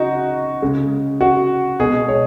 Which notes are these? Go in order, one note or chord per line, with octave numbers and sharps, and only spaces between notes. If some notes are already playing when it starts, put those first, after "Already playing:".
Already playing: C#3 D#4 F#4
C#3 G#3
F#4
B2 G#3 G#4
C#5